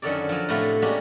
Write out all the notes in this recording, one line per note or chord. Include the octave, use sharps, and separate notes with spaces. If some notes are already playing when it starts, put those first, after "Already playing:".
F#2 D3 D#3 A4 C#5 D5
F3 F#3
A2 C3 A3 F4 F#4
G3 G#3 A#3 C#4 F#4 G4